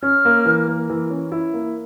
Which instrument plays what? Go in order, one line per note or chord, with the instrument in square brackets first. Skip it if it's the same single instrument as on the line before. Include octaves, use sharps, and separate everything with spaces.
[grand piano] C#4 [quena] F6
[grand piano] A#3
E3
A#3
E3
C#4
E4
A#3